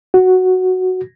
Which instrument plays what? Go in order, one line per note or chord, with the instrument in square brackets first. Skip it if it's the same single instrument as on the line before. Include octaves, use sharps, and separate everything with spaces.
[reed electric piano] F#4